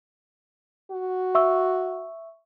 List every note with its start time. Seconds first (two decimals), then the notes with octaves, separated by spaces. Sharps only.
0.91 F#4
1.35 E5 C#6 E6